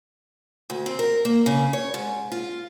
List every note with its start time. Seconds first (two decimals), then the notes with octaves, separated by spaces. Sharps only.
0.70 D2
0.86 C4
0.99 A#4
1.25 A#3
1.46 C#3
1.73 C#5
1.94 G#2
2.32 F4